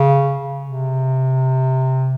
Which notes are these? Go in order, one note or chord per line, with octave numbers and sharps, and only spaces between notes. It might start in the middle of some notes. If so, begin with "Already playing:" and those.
Already playing: C#3
C3